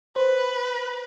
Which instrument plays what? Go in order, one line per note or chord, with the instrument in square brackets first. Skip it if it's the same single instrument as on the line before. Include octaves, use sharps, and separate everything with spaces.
[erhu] B4 [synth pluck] C5